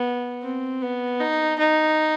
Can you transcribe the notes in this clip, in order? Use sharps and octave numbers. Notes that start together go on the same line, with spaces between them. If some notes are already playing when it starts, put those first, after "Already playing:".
Already playing: B3
C4
B3
D#4
D#4